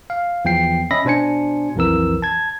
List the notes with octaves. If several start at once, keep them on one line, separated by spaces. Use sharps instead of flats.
F5
E2 F3 G5 C7
C#4 D#5 E5 B5 A#6
B2 D4 C5 G#5 C#7
B1 F2 E3 A#4 E6
A5 G#6